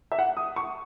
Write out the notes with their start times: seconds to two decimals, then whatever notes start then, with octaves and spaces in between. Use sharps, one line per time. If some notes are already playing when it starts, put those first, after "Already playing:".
0.12 E5
0.19 F#5
0.37 D#6
0.56 C#6